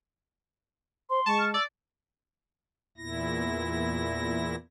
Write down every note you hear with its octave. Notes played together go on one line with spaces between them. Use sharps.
C5 C6
G#3 A5 C#6
F6
D5 E6
E2 A#2 E4 A#6